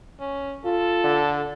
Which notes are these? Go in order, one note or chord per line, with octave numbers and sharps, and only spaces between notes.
C#4
F4 A4
D3